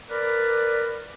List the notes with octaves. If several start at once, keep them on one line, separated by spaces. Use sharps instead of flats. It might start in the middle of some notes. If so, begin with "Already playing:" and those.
A#4 B4 D5